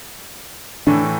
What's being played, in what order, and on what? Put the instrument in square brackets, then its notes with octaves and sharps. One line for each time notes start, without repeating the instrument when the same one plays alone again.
[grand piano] A2 E3 A3 [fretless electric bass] D4